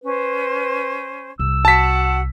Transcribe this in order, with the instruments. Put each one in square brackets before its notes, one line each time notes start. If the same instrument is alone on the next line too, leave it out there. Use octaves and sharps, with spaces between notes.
[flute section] C#4 C5 [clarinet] B4
[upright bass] C2 [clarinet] E6
[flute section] F#4 F#5 [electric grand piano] A5 B6